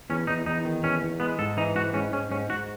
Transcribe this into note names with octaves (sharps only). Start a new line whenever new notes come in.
E2 C#4
E2 D#4
E2 D#4
D#3
E2 C#4
E2
G#3 B3
G#2 A4
E3 D#4
G#2 F#4
G#2 C#4
G#2 C#4
G#2 C#4
G#2 F#4